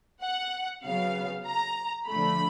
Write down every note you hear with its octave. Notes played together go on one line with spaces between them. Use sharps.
F#5
C#3 F#3 B3 F5
A#5
D3 F3 A3 B5